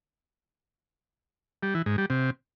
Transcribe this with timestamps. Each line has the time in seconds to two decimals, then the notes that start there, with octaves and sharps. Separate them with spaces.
1.63 G3
1.74 E3
1.86 G#2
1.98 G3
2.10 C3